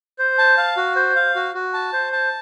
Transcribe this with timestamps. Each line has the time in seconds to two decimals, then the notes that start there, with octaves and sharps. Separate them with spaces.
0.19 C5
0.38 A5
0.57 F5
0.77 F#4
0.96 C5
1.16 F5
1.35 F#4
1.54 F#4
1.73 A5
1.93 C5
2.13 A5